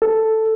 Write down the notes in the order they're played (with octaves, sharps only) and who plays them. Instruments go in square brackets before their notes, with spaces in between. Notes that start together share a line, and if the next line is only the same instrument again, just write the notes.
[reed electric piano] A4